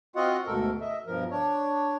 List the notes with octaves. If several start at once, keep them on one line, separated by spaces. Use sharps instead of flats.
C4 F4 F#4 D#5 F#5
D2 G#2 B2 A4 A#4
D#5 E5
G2 B2 F3 A#4
D4 C#5